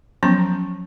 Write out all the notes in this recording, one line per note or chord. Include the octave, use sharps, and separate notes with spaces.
F3 F#3 B3 C#4 A#5